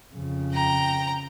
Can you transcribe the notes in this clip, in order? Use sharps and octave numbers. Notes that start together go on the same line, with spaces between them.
F2 C#3
G5 A#5